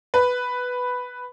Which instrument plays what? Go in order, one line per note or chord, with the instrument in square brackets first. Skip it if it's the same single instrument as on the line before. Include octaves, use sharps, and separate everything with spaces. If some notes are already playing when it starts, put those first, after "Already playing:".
[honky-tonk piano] B4